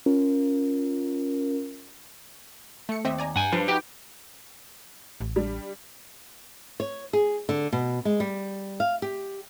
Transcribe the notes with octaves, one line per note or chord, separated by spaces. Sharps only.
C#4 F4 A#4
A3 C#7
D#2 C4 D#5 E5
D5 G#5 A#5
G2 F#5 G#5
F3 G3 D4 B4
D#4 F#4 G4 B4 G5
A1
G3 D4
C#5
G#4
D3
B2
G#3
G3
F5
G4